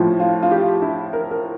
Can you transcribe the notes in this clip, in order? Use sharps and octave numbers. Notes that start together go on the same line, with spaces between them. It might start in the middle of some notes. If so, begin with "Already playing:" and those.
Already playing: A2 F3
F4
F4
G4
E4
A#4
A#4